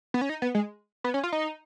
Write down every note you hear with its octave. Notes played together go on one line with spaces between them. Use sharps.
B3
C#4
D#4
B3
G#3
B3
C#4
F4
D#4